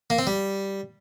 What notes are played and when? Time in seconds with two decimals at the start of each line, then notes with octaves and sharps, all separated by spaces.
0.10 A#3
0.19 C4
0.27 G3